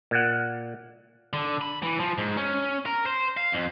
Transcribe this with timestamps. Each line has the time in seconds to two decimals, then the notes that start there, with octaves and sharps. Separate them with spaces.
0.11 A#2 F#5
1.33 D3
1.61 B5
1.83 E3
2.00 F3
2.18 G#2
2.37 C#4
2.86 A#4
3.06 C5
3.37 F5
3.52 F2